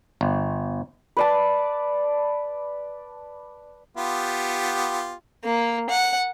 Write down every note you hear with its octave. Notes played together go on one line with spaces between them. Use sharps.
G1
B4 D5 A5
B3 F4 G4
A#3
F#5